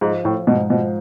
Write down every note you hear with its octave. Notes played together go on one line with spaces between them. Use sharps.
G#2 F3
A2 F3
G#2 B2
B2 F3